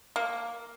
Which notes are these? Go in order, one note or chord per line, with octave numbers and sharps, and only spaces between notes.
A#3